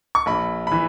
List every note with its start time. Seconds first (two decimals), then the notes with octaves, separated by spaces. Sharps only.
0.15 C#6
0.26 A#1 B5
0.67 E3 B5